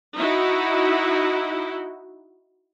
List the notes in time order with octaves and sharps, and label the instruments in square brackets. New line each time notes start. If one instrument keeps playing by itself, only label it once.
[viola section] D#4 E4 F#4